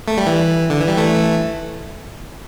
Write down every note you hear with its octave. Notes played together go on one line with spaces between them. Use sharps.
A3
G3
E3
D3
E3
G3
E3 A3